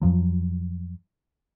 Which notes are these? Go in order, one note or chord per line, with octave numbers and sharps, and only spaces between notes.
F2 F3 F#3